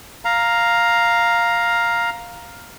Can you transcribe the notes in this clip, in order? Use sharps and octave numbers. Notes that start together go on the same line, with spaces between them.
F5 A#5